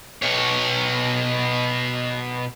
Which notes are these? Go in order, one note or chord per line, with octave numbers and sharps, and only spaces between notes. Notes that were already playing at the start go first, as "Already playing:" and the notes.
B2 C#5